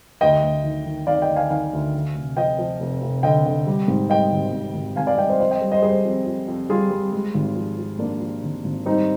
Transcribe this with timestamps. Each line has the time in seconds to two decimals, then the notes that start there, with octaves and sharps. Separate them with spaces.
0.21 D2 D#5 G5
0.43 D2
0.64 D#3
0.86 D#3
1.07 D#3 D5 F5
1.22 D#5 G5
1.29 D2
1.36 F5 G#5
1.50 D#3 F5 G#5
1.73 D2
1.94 D3
2.15 F1
2.37 F3 D#5 G5
2.58 F3
2.80 F1
3.02 F1
3.23 D3 D#5 G5
3.46 D3
3.67 G3
3.88 G#2
4.10 G3 D#5 G5
4.32 G#1
4.53 G#2
4.74 G#1
4.96 G#1 F5 G#5
5.07 D5 F5
5.18 G3 D#5 G5
5.29 C5 D#5
5.39 F2 C5 D#5
5.51 D#5 G5
5.61 G3
5.72 C5 D#5
5.82 G3 G#4 C5
6.05 F2
6.26 F2
6.48 F2
6.69 G3 F4 G#4
6.91 G3
7.12 G#3
7.34 G#1
7.56 F3
7.77 F3
7.99 F3 A#3 D4
8.20 F3
8.43 G#1
8.64 G#1
8.86 G3 C4 D#4